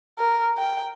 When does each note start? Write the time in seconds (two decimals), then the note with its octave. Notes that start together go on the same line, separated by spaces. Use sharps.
0.19 A#4
0.58 G5